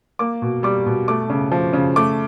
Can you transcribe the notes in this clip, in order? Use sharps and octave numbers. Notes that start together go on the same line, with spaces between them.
A#3 D6
B2
G3 D6
B2
A3 D6
C#3
F3
C#3
A3 D6